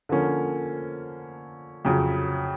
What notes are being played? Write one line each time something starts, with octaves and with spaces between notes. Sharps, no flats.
D3 F3 A#3 C#4
F2 C#3 F#3